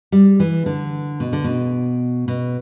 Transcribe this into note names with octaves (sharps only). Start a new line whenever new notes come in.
G3
E3
D3
B2
D3
B2
B2